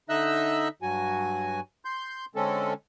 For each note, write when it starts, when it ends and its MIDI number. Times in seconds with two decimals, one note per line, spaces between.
0.09 0.68 50
0.09 0.68 63
0.09 0.68 75
0.09 0.68 76
0.09 0.68 88
0.09 0.68 90
0.82 1.60 43
0.82 1.60 54
0.82 1.60 66
0.82 1.60 80
1.85 2.25 84
1.85 2.25 91
2.35 2.73 50
2.35 2.73 56
2.35 2.73 60
2.35 2.73 61
2.35 2.73 69